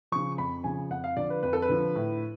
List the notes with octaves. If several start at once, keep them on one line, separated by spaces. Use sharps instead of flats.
C#3 F3 C#6
F2 B5
C#3 F3 G#5
F2 F#5
F5
D3 F3 D5
B4
F2 B4
A4
B4
D3 F3
A2